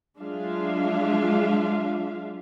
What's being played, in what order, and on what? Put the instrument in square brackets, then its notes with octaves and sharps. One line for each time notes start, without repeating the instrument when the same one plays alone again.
[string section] F#3 G#3 D4 F4 E5 F5